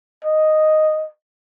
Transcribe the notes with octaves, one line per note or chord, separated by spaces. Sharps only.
D#5